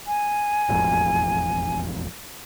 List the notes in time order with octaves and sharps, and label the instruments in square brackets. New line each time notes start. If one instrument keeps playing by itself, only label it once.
[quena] G#5
[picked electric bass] E1 A1 F2